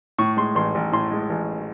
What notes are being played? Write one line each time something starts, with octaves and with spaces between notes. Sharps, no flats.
A2 C#6
G#3 C6
A1 C6
A1
A2 C6
G#3
A1